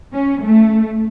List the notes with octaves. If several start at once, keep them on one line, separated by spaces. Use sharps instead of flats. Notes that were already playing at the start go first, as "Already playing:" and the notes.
C#4
A3